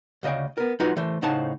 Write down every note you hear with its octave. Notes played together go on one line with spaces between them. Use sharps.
D2 C#3 D#5 F5 G5
B3 A#4
F#3 D#4 F4 F#4 B4 D#5
E3 A3 C5
A2 C#3 D#4 C5 F#5 A5